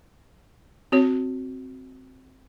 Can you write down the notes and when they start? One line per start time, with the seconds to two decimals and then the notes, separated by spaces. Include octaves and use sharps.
0.92 C4 F#4 C#5